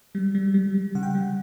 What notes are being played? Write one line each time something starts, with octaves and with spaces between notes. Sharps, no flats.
G3
G3
G3
G3
C#3 F#5
G5
G3 F#5